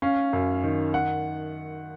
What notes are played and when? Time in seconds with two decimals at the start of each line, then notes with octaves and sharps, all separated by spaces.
0.02 C#4 F5
0.33 F#2
0.64 D#3
0.94 F#5